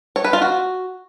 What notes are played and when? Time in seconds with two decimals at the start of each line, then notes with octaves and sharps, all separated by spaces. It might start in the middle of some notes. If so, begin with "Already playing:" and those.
0.16 C#5
0.24 B4
0.33 F4
0.42 F#4